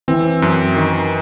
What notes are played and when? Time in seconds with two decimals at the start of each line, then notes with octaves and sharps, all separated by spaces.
0.08 E3 C4
0.42 F#2
0.76 D#3